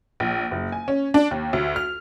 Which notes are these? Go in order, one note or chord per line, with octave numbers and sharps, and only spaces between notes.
A#1
F#1
G#5
C#4
D4
D#2
D2
F6